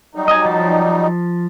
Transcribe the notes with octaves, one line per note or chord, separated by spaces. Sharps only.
F#3 G3 D#4
D#5 G#5
F3 A5